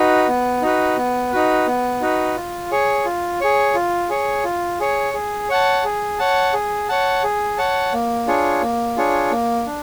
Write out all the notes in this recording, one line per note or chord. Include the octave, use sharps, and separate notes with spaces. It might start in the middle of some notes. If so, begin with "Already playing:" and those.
Already playing: D#4 F#4 B4
B3
D#4 F#4 B4
B3
D#4 F#4 B4
B3
D#4 F#4 B4
F4
G#4 C#5
F4
G#4 C#5
F4
G#4 C#5
F4
G#4 C#5
G#4
C#5 F#5 A5
G#4
C#5 F#5 A5
G#4
C#5 F#5 A5
G#4
C#5 F#5 A5
A#3
D4 F4 G#4 C#5
A#3
D4 F4 G#4 C#5
A#3
D4